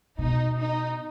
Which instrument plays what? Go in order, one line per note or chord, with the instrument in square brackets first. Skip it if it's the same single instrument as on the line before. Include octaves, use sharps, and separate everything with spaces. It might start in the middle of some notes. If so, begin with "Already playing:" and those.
[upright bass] B2 [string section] D#4
[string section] D#4